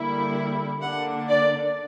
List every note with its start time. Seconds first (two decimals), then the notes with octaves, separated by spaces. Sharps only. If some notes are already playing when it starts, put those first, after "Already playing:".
Already playing: D3 G3 A#3 E4
0.83 D3 A#3 D4 F#5
1.28 D5